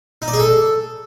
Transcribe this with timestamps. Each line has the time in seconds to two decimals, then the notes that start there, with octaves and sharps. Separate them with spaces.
0.22 D#4
0.28 D5
0.33 G#4
0.39 A4